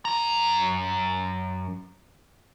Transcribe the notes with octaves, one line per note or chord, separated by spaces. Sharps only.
F#2 A#5